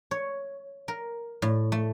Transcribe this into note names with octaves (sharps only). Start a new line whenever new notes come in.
C#5
A#4
A2
A3